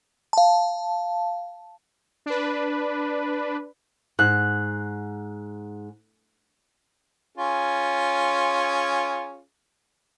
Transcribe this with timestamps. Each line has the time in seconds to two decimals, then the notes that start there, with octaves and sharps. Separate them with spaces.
0.33 F5 A5
2.26 D4 B4
4.19 G#2 F#6
7.37 C#4 F4 G#4